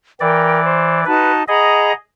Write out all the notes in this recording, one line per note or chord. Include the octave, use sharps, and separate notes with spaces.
E3 A#4 D5 G5
C5
D#4 F#4 B4 A5
G#4 D#5 F#5 A#5 B5